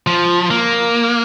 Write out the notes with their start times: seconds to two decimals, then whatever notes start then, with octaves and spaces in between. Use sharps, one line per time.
0.07 F3
0.51 A#3